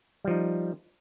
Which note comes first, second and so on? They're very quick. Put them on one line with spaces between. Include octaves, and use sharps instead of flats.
G3 F3 D#4